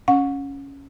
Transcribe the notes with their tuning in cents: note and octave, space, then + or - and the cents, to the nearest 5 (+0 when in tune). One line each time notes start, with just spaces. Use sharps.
C#4 +0 F#5 -35